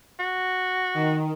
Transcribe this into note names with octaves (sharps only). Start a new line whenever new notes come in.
F#4
D#3